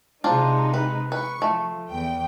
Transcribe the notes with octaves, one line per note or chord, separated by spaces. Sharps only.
C3 G#3 D4 D#4 F4 C5
B4
B4 C#6
F3 A3
E2 G5